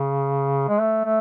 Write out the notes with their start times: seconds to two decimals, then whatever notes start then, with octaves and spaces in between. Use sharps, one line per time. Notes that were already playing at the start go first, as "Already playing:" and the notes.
Already playing: C#3
0.69 G#3
0.81 A3
1.05 A3